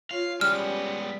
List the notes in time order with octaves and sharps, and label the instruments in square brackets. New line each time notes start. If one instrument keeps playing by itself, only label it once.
[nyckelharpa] F4 C#5 [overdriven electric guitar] F5
[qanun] G3 [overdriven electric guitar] G#3 B3 [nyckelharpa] C#4 G4 [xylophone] F6